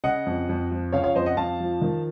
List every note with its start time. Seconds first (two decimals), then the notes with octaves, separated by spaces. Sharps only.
0.04 C#3 D#5 F#5
0.26 F2
0.49 F2
0.71 F3
0.92 C#3 C#5 F5
1.04 C#5 F5
1.15 F2 C5 D#5
1.26 D#5 F#5
1.37 F2 F5 A5
1.60 F3
1.82 D#3